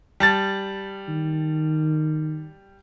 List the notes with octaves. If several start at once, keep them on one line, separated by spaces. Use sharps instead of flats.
G3 A5 A6
D#3